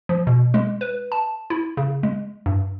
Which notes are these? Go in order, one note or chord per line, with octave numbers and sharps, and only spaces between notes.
F3
B2
G#3
B4
A5
E4
C#3
G#3
G2